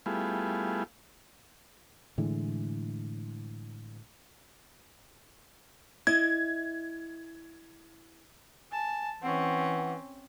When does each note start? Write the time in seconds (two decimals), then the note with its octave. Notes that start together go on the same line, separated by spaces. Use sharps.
0.06 G3 A3 B3 E4 F4 G#4
2.18 A2 D3 E3 G#3
6.07 E4 D#5 G#6
8.72 G#5 A5
9.22 E3 C4 C#4 F#5